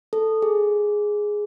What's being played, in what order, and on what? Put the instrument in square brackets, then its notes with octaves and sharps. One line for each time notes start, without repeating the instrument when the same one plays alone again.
[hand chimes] A4
G#4